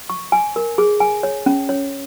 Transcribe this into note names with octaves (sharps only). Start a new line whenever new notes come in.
C#6
G#5
A#4
G#4
G#5
C#5
C#4
C#5